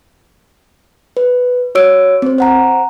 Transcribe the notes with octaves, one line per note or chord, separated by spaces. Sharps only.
B4
F#4 C#5 E6 D7
C4 C5
C5 F#5 A#5